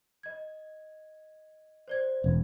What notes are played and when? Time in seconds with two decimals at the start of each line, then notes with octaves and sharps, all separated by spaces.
0.23 D#5 G#6
1.88 C5 D5 G#6
2.24 E1